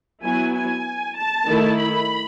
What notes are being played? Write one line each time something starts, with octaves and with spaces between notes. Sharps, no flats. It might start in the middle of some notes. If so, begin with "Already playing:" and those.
F#3 B3 E4 G#5
G#5
A5
D#3 A3 E4
B5